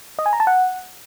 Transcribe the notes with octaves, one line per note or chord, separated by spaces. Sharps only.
D#5
G#5
A#5
A5
F#5